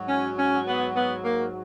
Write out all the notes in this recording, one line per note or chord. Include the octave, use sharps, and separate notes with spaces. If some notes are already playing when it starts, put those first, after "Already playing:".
Already playing: G#2 F#3
C#4
C#4
B3
B3
A#3